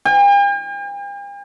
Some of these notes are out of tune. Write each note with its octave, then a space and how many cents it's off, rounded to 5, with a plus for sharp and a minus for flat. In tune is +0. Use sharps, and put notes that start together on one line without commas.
G5 +45